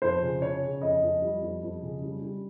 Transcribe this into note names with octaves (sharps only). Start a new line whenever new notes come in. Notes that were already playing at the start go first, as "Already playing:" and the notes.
F2 C5
C#3
C#3 C#5
C#3
F2 D#5
F2
G3
F2
F2
C#3
G3
G3